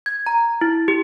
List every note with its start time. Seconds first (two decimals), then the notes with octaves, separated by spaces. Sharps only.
0.06 G#6
0.26 A#5
0.61 E4
0.88 G4